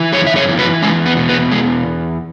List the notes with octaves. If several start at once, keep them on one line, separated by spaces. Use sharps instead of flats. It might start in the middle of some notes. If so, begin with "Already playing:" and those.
Already playing: E3
F#2 G#4 C#5
E5
G#4 C#5
E3
F#4 B4
E2 G#3 C#4
B3
B2
B3
E2 G#3